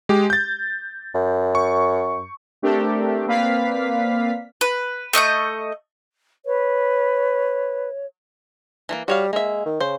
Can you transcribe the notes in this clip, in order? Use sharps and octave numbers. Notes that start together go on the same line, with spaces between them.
G#3 G4
G6 A6
F#2
C#6
A3 C4 D4 G4 A4 A#4
A#3 C4 B4 D5 F5 B6
B4
A3 D#5 C#6 G6
B4 C#5
E3 A3 A#3
G3 F#4 C#5 F5
G#3 A#3 E5
D#3
C#3 C5